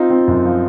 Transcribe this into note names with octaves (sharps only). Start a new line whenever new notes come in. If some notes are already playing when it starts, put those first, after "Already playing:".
Already playing: C4 D#4 F4
C4
F#2
F3